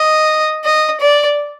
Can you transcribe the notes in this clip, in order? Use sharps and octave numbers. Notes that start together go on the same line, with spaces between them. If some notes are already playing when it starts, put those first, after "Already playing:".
Already playing: D#5
D#5
D5